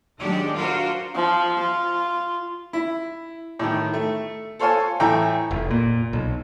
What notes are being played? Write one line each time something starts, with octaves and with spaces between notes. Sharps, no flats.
D#3 F#3 G#3 D4 G4 D5
D4 F4 F#4 A#4 C5
F3
F4
E4
A2 D#3
A3
A4 C5 C#5 F5 G#5 A5
A2 E3 A3 G5 A#5
F1
A#2
B1